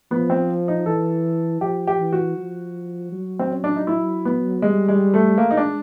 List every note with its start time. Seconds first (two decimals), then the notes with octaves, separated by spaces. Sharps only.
0.11 F3 B3
0.30 C4
0.68 D#4
0.86 E3 A4
1.61 F3 G4
1.87 G4
1.99 E3
2.12 F#4
2.38 F3
3.12 F#3
3.39 C4
3.51 C#4
3.64 D4
3.76 D#4
3.87 E4
4.25 B3
4.62 G3 G#3
4.88 G#3
5.14 A3
5.38 G#3 A#3
5.51 D#4
5.57 D4